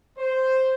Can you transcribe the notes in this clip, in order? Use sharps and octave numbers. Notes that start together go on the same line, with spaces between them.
C5